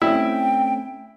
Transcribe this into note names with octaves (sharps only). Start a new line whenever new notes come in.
A3 C4 C#4 E4 G5